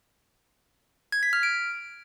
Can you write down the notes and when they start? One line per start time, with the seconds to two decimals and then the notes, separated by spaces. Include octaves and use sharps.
1.12 G#6
1.23 B6
1.33 F6
1.43 D7